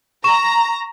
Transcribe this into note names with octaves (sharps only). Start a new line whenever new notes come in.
A#5 C#6 E7